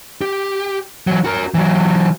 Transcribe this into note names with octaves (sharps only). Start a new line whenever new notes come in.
G4
E3 F#3
F#4 A#4
E3 F#3